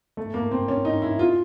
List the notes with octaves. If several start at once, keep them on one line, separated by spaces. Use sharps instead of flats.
A3
A#3
C4
C#4
D#4
E4
F4